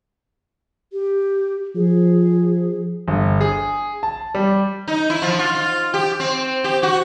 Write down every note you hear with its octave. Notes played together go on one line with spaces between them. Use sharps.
G4
F3 G#4
G1
G#4
A5
G3
D#4
E4
F3
F4
F4
G4
C4
G4
F#4